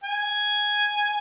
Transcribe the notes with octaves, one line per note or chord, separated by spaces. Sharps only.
G#5